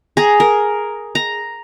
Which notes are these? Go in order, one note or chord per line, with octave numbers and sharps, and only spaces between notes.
G#4 A#5
A#4
A#5